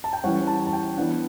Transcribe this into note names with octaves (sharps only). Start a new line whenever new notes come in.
A5
G5
E3 G3 C#4 F#5
A5
A5
G5
E3 B3 D4 F#5